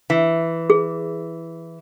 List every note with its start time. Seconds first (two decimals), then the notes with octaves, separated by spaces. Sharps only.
0.10 E3
0.70 G#4